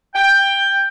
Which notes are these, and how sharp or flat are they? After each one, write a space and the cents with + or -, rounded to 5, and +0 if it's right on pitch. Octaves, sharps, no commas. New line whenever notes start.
G5 +10